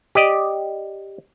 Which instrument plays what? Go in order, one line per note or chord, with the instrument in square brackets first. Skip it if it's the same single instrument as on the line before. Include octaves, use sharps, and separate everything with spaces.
[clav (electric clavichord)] G4 D5 D#5